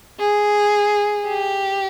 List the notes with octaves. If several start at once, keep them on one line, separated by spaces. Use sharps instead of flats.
G#4
G4